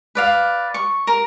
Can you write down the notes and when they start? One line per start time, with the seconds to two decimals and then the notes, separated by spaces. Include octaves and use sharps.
0.15 B4 D5 F5
0.74 C#6
1.07 A#4